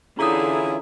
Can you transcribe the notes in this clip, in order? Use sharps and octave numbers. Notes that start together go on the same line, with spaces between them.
D3 E3 C#4 E4 F4 G#4 A#5 D#6